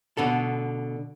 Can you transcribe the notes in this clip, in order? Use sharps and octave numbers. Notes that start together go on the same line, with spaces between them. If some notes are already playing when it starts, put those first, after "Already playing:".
B2 D3 A4